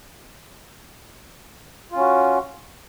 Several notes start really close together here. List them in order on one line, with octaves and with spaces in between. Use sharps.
F4 C#4 F#4